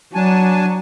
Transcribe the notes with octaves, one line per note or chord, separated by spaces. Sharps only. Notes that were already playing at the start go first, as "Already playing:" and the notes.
F#3 D4 G#5 A5